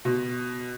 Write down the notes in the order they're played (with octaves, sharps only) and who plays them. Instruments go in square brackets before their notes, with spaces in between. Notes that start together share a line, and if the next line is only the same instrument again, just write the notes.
[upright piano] B2